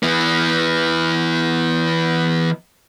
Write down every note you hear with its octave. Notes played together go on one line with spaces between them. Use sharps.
E3 B3